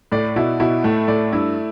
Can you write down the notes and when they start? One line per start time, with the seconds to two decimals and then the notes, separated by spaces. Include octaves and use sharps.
0.12 A2 D5
0.36 B2 E4
0.60 B2 E4
0.84 A2 A3
1.08 A2 D5
1.32 G2 E4